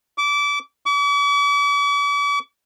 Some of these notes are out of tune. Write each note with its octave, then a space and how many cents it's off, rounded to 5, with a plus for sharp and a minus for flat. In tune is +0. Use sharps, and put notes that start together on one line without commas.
D6 -25
D6 -45